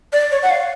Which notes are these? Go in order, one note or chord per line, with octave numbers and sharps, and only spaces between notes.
D5
C#5
F#5
F5